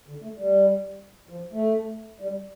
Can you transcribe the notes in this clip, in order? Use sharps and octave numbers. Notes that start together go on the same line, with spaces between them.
D3
A3
G3
F3
A3
G3